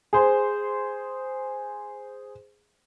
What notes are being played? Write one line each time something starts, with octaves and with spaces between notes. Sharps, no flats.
G#4 C5